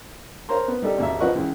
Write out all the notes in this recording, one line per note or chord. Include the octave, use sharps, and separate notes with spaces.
A#4 C5 C#5 A#5 C6
B3
G3 D#4 G4 A4
G#1 D#2 E5
F3 B4 D#5 F#5 C#6
C#2 E3